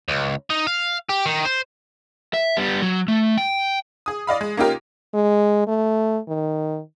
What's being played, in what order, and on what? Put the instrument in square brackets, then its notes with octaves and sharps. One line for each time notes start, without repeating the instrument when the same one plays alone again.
[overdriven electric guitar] C#2
D#4
F5
G4
D#3
C5
E5
G3 B3
F#3
A3
G5
[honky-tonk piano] G#4 D#6
D5 D#5 F5 B5
G#3
A#3 C#4 D#4 F4 G4 A#4
[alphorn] G#3
A3
D#3